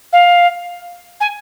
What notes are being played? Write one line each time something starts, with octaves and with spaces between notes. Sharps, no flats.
F5
G#5